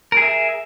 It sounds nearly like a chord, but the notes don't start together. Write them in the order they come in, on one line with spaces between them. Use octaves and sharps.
A#4 G#4 E5